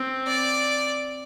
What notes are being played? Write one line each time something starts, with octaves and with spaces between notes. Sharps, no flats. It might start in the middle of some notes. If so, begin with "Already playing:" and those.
Already playing: C4
D5